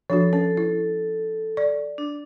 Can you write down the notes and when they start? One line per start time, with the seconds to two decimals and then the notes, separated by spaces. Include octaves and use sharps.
0.10 F3 D4 F#4 A4
0.33 C#4 A4
0.57 E4
1.57 D5
1.98 D4